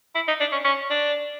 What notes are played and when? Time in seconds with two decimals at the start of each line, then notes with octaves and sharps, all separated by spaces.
0.15 E4
0.28 D#4
0.40 D4
0.52 C#4
0.65 C#4
0.90 D4